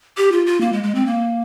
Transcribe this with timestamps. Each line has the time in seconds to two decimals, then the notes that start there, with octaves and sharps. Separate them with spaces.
0.17 G4
0.32 F4
0.46 F4
0.61 A#3
0.72 G#3
0.83 G#3
0.95 C4
1.06 A#3